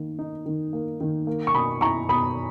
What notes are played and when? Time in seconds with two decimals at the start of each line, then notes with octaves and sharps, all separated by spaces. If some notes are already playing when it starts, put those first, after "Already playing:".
Already playing: D#3 A#3
0.19 D#4
0.46 D#3
0.73 A#3
1.01 D#3
1.27 A#3
1.47 C#6
1.54 B2 B5 D#6
1.81 E4 A#5 C#6
2.09 B2 B5 D#6